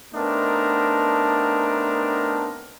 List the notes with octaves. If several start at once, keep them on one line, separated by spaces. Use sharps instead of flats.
A3 B3 C4 D4 D#4 A#4